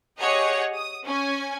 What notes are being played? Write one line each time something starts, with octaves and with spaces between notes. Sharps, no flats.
G4 G#4 C#5 D#5 F#5
D#6
C#4 G#5